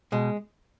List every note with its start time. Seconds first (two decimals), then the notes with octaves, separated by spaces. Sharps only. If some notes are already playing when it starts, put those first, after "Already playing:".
0.12 B2 G#3